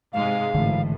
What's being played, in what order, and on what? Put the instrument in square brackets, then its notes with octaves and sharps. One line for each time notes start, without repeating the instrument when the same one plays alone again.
[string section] G#2 C3 G#3 [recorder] F5
[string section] G#1 A2 [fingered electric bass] D3 E3